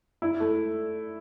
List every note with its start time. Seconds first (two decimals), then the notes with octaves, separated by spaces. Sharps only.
0.22 E4
0.40 A3